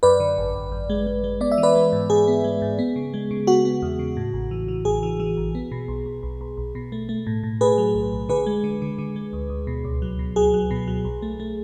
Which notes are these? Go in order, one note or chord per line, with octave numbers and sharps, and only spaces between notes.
F#2 B4 D5
D3
G#1
G#1
F#2
G#3
G#3
G#3
B3 D5
E5
E3
B4 D5
G#3
G#2
G#2 G#4
B3
G#3
G#2
B3
C#3
G#3
C#3
B3 F#4
B3
E2
C#3
A2
A1
E3
E3
A1 G#4
E3
E3
A1
B3
B2
B1
B1
B1
B1
B1
B2
A3
A3
A2
A2
A3 G#4 B4
F#3
B1
B1
D3 G#4 B4
G#3
D3
D3
D3
G#3
D2
D2
B2
C#2
F#3
B2
F#3 G#4
F#3
B2
F#3
B1
A3
A3